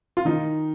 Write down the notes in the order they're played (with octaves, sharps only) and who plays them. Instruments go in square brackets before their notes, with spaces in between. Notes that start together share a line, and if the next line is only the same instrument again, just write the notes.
[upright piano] F4
[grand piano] D#3 [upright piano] D#4